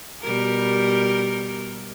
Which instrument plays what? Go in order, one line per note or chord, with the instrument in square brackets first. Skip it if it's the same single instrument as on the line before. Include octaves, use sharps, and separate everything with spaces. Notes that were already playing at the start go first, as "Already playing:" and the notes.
[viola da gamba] B2 G3 A#4